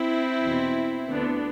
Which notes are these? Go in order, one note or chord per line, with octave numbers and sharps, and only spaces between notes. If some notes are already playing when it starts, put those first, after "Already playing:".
Already playing: C4 E4
E2 B2
D2 D3 B3 D4